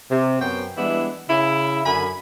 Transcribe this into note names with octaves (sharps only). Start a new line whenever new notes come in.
C3
F#2 B3 C5 C#5 G5
E3 G3 G#3 B3 D4 E4
C#3 E4
F#2 D3 A4 G#5 B5